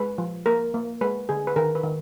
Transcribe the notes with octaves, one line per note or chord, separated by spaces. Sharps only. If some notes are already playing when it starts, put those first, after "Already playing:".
Already playing: G#3 B4
F3
A#3 A#4
A#3
G#3 B4
D3 G#4
B4
D#3 A#4
B4
D#3